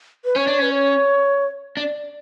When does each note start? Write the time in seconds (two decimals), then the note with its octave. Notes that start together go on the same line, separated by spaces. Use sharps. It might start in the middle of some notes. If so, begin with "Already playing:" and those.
0.25 B4
0.36 C#4 C#5
0.47 D4
0.59 C#4 B4
0.71 C#5
1.77 D4 D5